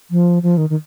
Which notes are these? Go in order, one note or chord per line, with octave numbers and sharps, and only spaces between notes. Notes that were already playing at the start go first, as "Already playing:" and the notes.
F3
F3
D#3
D#3